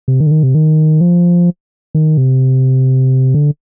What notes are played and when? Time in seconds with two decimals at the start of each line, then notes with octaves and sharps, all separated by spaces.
0.08 C3
0.20 D#3
0.26 D3
0.31 D#3
0.43 C3
0.55 D#3
1.01 F3
1.95 D#3
2.17 C3
3.34 D3